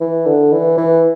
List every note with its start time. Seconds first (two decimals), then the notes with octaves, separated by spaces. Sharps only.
0.01 E3
0.26 D3
0.53 E3
0.78 E3